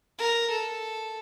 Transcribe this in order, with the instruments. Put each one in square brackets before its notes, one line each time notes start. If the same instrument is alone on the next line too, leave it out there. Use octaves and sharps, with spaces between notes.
[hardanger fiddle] A#4
A4